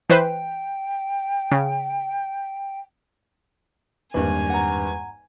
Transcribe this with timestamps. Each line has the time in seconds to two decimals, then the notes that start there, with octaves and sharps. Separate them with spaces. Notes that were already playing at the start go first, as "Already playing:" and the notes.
0.10 E3 B4 C5 G5
1.51 C#3
4.14 G#1 E2 G2 A#3 B4 G#5
4.50 F#5 A#5